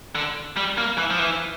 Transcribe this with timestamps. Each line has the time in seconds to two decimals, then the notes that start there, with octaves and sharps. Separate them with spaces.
0.15 D3
0.57 G3
0.78 A#3
0.98 E3
1.10 F3
1.19 E3